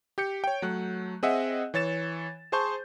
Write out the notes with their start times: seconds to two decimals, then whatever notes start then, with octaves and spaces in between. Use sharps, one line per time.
0.18 G4 G6 C#7
0.44 C#5 G5
0.62 F#3 A3 F#6
1.23 C4 G#4 D#5 E5 F#5
1.74 E3 C#5 A6 E7
2.52 G#4 C5 A5 C6 C#6 G6